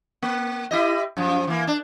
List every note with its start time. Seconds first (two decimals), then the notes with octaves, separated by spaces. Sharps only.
0.23 A#3
0.71 E4 G4 D#5
1.17 F#2 F3
1.47 E3 A#3
1.67 D4